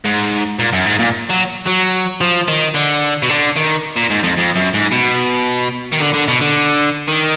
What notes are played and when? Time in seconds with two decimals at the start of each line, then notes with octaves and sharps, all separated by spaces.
0.05 G#2
0.59 A#2
0.73 F#2
0.85 G#2
0.99 A#2
1.30 F#3
1.67 F#3
2.21 F3
2.48 D#3
2.75 D3
3.23 B2
3.30 D3
3.57 D#3
3.97 A#2
4.10 G#2
4.23 F2
4.38 F2
4.56 F#2
4.74 G#2
4.92 B2
5.92 D#3
6.00 D3
6.13 D3
6.28 B2
6.41 D3
7.08 D#3